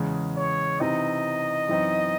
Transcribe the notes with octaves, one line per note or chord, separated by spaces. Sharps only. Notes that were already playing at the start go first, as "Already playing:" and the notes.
Already playing: E2 C#3 G#3
C#5
C3 E3 C4 D#4 D#5
F#2 E3 C4 D#4